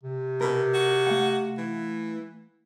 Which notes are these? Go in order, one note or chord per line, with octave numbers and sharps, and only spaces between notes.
C3
B2 A#4
F#4
A3 F5 F#5
E3